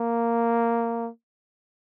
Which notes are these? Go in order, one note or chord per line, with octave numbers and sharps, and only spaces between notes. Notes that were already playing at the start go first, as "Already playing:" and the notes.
Already playing: A#3